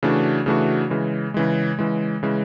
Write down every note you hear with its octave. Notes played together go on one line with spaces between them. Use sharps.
C#3 E3 A3 D4 F#4
C#3 E3 A3 D4 F#4
C#3 E3 G#3
C#3 E3 G#3
C#3 E3 G#3
C#3 E3 G#3